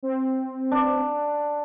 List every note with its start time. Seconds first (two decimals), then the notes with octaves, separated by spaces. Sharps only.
0.03 C4
0.72 D4